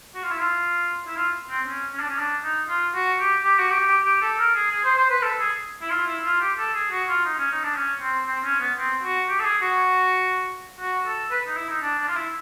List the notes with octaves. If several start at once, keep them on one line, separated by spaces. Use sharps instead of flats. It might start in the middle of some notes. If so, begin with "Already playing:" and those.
F#4
F4
E4
F4
E4
F4
C4
C#4
C#4
D4
C#4
D4
D#4
F4
F#4
G4
G4
F#4
G4
G4
G4
A4
A#4
G#4
G#4
C5
C5
B4
A4
G#4
E4
F4
E4
F4
G4
A4
G#4
F#4
F4
D#4
C#4
D#4
D4
C#4
C4
C4
C#4
B3
C4
F#4
G4
A4
G#4
F#4
F#4
A4
B4
D#4
E4
D#4
D4
D4
F4
E4